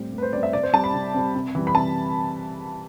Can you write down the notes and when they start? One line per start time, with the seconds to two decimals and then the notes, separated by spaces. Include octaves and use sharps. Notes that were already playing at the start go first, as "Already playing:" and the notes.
Already playing: A2 G3 C4 G4
0.13 A2
0.18 B4
0.23 C5
0.33 G3 C4 D5
0.43 E5
0.53 C3 D5
0.63 C5
0.73 G3 C4 A5
0.84 B5
0.94 C3
1.14 G3 C4
1.35 C3
1.55 E3 G3
1.67 B5
1.75 C3 A5